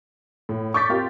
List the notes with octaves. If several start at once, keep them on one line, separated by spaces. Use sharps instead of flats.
A2
C#6 D6 G6 A6 B6
C4 F4 G4 A#4